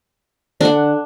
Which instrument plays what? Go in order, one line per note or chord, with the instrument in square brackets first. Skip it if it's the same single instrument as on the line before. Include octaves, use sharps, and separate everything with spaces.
[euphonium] D3 [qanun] D4 F#5